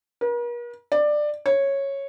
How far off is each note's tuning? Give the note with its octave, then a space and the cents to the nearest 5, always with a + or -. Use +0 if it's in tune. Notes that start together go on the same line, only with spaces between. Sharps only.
A#4 +45
D5 +15
C#5 -10